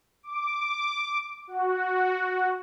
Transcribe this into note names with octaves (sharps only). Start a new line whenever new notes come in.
D6
F#4